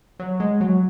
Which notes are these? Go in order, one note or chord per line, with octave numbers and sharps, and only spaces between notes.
F#3
G#3
F#3